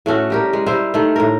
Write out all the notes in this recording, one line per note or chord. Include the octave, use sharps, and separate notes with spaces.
A2 A3 C#4 F#4
G3 G4 A#4
G#3
G3 E4 C5
D#3 A3
A2 A#4